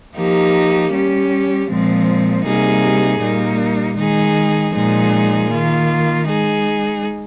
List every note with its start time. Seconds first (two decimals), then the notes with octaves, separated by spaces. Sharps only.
0.16 F3 A#3 D#4 G4
0.92 G3 C#4 G4
1.69 A#2 F3 G#3 C4
2.45 C3 G3 A#3 D#4 G#4
3.21 A#2 G3 A#3 D#4
3.98 D#3 G#3 D#4 G#4
4.74 A#2 F3 G#3 D#4 G#4
5.50 D#3 A#3 F4
6.27 G#3 D#4 G#4